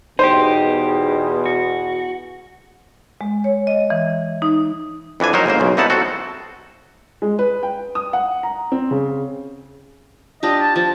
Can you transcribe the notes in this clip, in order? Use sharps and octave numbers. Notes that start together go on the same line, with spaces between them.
E2 B2 D#4 G4 G#4 C5
F#4
G#3
C#5
D#5
E3
D#4
F2 E3 D4 G#5
F#3 D#4 A#4 C5
G1 G#2 A#3 C5
B1 C#3
C2 E3 D#4 E4 F#5 A5
C4 F#4 A4
G#3
B4
G5
D#6
F#5
A#5
C4
C#3
D4 F4 G4 D#5
A5
F3 A5